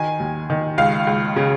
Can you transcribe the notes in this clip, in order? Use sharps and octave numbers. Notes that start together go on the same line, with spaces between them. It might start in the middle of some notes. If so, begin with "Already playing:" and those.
Already playing: D#3 G#5
D#2
D#3
C#2 F5
C#2
C#3